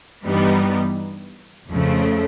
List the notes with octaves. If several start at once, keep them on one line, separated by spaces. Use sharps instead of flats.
G2 E3 G3 B3 D#4
F2 C#3 F3 A3